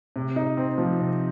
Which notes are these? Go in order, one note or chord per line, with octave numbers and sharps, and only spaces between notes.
C3
D#4
C4
F3
C3